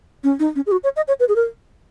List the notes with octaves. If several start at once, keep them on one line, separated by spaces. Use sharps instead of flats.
C#4
D#4
C#4
G#4
F#4
C#5
D#5
C#5
B4
G#4
A#4